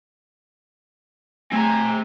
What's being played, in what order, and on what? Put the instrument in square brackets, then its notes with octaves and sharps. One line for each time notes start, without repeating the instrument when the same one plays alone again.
[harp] A3 [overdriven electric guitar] C4 A#5 [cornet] G#5